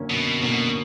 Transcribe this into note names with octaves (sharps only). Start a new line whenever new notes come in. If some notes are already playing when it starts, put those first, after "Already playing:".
Already playing: F#2 D3 A#3 C#4
F#2 B2
B2 D3 A#3 C#4